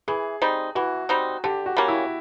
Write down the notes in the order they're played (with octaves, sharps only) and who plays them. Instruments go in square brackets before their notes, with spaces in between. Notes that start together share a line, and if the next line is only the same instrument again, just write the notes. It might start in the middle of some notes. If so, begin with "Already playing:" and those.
[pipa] E3 [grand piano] G#4
[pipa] G3 C4 D#4
[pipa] E3 [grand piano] F#4
[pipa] G3 C4 D#4
[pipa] D3 [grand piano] G4
[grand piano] F#4
[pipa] G3 A#3 C#4
[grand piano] E4